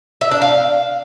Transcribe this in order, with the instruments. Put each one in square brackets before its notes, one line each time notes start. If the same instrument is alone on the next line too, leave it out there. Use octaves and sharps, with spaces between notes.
[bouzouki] E5
D4
F5